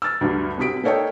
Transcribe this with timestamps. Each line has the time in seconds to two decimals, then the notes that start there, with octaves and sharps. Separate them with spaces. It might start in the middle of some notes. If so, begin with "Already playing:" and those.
0.02 E6 F6 A6
0.21 D2 G2 F#3
0.57 C2 C3 F#4 D#6 B6 D7
0.83 A#3 D#4 A4 C#5 D#5 G5